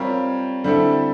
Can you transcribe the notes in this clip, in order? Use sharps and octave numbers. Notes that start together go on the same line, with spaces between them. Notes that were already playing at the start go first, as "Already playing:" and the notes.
Already playing: G3 C4 F4 A#4 C#5
D3 G3 C4 E4 A4